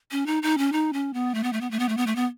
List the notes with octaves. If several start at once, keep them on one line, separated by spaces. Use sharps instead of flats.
C#4
D#4
D#4
C#4
D#4
C#4
B3
A3
B3
A3
B3
A3
B3
A3
B3
A3
B3